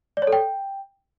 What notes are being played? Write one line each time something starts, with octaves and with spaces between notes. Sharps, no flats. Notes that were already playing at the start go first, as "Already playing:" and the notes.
D5
C#5
A4
G5